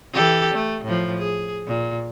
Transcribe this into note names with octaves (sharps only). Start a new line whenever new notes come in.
E3 G4 A4
A3
A2 F3
G#4
A#2